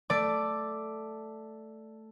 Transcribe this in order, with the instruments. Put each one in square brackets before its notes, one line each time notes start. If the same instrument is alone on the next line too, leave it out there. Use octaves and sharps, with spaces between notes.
[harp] A3 D5 D6